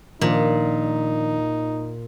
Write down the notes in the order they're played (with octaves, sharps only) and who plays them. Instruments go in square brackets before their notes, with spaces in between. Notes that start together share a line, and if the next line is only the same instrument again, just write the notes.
[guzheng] A#2 [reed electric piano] D#3 F3 D4 [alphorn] D#4